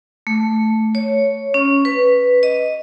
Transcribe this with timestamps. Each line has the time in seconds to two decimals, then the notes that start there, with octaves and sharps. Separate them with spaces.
0.27 A3
0.95 C#5
1.54 C#4
1.85 B4
2.43 D#5